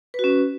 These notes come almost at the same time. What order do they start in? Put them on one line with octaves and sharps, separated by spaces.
B4 F#4 C#4